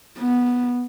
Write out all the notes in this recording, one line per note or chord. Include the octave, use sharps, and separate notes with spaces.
B3